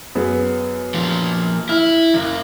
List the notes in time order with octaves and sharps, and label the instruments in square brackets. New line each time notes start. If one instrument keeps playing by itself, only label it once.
[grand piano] F#2 B3 G#4
[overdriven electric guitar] A#2 F3
[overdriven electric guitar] E4 [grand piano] F6
[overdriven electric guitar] F#2 C#3